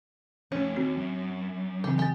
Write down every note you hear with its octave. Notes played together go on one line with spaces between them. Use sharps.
F2 A3 C#4
D#2 C4 F#4
F#2
C#3 E3 C4 G4
F#3 G#3 G4 G#5 A6